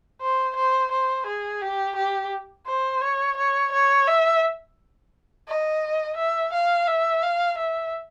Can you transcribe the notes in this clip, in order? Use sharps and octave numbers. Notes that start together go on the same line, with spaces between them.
C5
C5
C5
G#4
G4
G4
C5
C#5
C#5
C#5
E5
D#5
E5
F5
E5
F5
E5